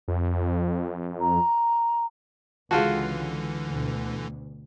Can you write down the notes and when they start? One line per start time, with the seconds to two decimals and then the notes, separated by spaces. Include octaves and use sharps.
0.08 F2
1.20 A#5
2.71 C#2 D3 E3 F4 F#4 G#4 F5 A5
3.68 D2 B2